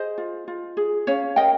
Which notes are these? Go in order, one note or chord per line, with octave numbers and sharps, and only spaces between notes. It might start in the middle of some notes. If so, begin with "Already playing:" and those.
Already playing: G#4 C5 D#5
F4
F4
G#4
C#4 C#5 F5
A#4 D#5 G5